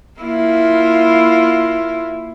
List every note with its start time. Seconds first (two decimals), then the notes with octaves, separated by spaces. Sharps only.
0.20 A#3 E4 F4